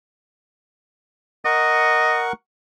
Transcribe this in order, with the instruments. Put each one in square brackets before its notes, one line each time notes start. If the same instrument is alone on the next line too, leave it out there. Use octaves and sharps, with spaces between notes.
[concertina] A#4 F#5 C#6 [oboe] D#5